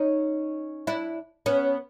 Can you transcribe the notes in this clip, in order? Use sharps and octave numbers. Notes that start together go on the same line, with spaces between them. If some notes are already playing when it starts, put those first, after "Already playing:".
Already playing: C#4 D#4
D4 E4
B3 C#4